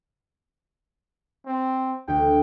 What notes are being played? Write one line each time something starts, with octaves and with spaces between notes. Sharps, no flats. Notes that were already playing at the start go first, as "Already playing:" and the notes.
C4
D2 G5